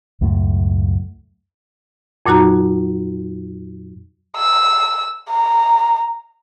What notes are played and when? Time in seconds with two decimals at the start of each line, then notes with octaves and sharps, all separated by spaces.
0.21 C#2 F#2 A2 A3
2.26 F2 A#2 F#3 D#4 F#4 A#5
4.37 E6
5.30 A#5